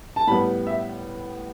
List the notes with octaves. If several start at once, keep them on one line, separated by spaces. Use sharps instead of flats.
A5
A2 G3 B3 B5
E5